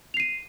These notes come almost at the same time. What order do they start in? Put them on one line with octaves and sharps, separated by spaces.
F7 C7 D#7